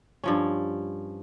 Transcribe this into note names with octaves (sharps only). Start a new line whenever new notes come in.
G2 F3 C#4